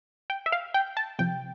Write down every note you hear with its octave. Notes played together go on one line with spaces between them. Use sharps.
G5
E5
F5
G5
A5
C3 F3 G5